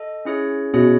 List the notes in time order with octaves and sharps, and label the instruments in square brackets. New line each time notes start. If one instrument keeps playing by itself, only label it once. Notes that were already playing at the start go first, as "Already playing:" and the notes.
Already playing: [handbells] A4 D#5
C#4 E4 G#4 C#5
[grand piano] B2 [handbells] C#4 E4 G#4 C#5